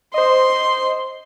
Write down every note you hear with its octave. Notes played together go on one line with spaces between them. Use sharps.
C5 D#5 C6